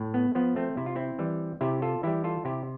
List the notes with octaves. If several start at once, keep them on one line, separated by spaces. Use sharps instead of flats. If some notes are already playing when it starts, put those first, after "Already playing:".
Already playing: A2
B3
F3 B3
A3 C4
C3 E4
F4
C4 E4
E3 G3
C3 E4 G4
F4 A4
E3 G3 E4 G4
F4 A4
C3 E4 G4